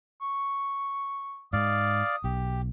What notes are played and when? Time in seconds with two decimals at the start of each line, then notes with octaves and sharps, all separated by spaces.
0.21 C#6
1.53 G#2 G#3 D5 F5 D#6
2.24 B1 G4